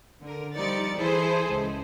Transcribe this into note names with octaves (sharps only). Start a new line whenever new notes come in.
D3 A#4
F3 G3 D#4 D5 A6 C#7
E3 E4 G#4 A4 C5
C#2